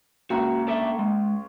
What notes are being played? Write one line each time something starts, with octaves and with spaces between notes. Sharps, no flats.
C#2 C#3 A#3 F#4 A#5
D4 A4 E5
G#3